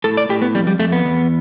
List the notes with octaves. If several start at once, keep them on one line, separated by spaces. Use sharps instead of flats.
A2 A4
D5
A2 G4
B3
F2 G3
G3
F2 A3
B3
E2